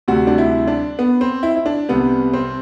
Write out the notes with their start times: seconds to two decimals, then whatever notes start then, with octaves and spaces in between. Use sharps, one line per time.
0.08 D2 C3 G3 F#4
0.27 D4
0.38 E4
0.67 D4
0.99 B3
1.21 C4
1.43 E4
1.56 E4
1.66 D4
1.89 C2 C3 G3 B3
2.33 C4